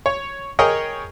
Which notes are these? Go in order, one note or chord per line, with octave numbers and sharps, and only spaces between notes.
C#5
G#4 A#4 C#5 D#5 G5